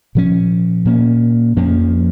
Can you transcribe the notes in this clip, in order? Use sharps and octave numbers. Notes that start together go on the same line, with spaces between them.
A#2 F3 C#4
A#2 A#3 C#4
F2 F3 A#3 C#4